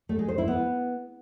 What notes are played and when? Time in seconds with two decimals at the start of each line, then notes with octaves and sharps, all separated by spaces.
0.09 A3
0.19 G#3
0.28 C5
0.38 E4
0.48 B3